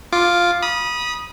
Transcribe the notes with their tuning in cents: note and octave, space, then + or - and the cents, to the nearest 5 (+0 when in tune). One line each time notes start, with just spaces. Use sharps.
F4 +0 D6 +0
B5 -30 D#6 +0